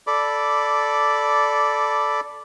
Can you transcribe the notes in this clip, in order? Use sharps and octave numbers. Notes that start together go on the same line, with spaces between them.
A4 D5 B5 D6